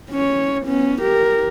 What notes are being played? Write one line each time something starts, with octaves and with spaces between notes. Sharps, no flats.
C#4 C#5
B3 C#4
G4 A#4